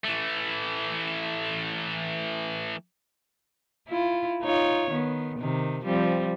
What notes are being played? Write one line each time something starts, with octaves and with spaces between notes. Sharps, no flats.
E3 A3
E4 F4
D#4 F4 C#5
D#3 B3
C3 D#3
F3 G3 C4